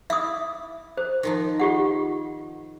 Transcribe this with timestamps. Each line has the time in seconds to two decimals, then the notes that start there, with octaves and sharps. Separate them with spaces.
0.10 E4 E5 D#6
0.97 C5
1.23 D#3 F3 D#4
1.60 F4 G4 F#5